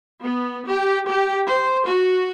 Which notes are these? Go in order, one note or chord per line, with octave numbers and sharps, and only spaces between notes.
B3
G4
G4
C5
F#4